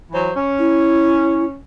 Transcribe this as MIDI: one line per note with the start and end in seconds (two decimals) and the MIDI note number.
0.12 0.30 52
0.12 0.30 54
0.12 0.30 72
0.36 1.55 61
0.58 1.44 64